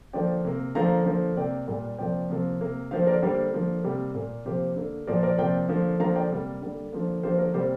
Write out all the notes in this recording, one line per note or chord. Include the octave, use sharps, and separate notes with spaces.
D3 F3 A#3 D5 G5
C3 A#3
D3 F3 A#3 F5 A#5
D3 F3 A#3
C3 A#3 D5 G5
A#2 G3 A#3
C3 F3 A#3 D5 G5
C3 F3 A#3
C3 A#3
D3 F3 A#3 C5 F5
A#4 D5
D3 G3 A#3 G4 C5
D3 F3 A#3
C3 G3 A#3 G4
A#2 A#3
C3 F3 A#3 G4 C5
D3 A#3
A#2 F3 A#3 A#4 D5
A#4 D5
C3 F3 A#3 D5 G5
D3 F3 A#3
D3 F3 A#3 F5 A#5
D5 G5
C3 G3 A#3
D3 G3 A#3
D3 F3 A#3
D3 F3 A#3 G4 C5
A#4
C3 G3 A#3 G4 C5